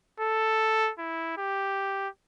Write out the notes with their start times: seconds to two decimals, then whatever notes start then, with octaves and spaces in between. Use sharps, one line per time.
0.20 A4
0.99 E4
1.38 G4